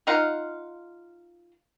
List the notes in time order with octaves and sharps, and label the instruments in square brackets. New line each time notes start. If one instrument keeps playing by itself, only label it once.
[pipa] D#4 F4 F5 F#5